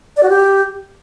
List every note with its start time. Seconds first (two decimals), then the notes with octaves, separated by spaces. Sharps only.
0.17 D5
0.23 F#4
0.29 G4